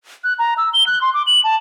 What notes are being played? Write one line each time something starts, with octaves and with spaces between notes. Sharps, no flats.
F#6
A#5
E6
G7
F#6
C6
D6
F#7
A5